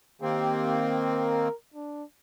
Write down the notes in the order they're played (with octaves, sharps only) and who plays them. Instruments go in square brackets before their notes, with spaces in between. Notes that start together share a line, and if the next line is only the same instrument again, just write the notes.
[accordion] D#3 A#3 C4 [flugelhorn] G4
[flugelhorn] A#4
D4